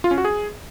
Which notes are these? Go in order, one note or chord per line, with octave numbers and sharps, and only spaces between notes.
F4
C#4
F#4
G#4